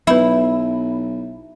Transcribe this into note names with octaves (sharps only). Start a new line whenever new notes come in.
B1 F#3 B3 E4 B4 E5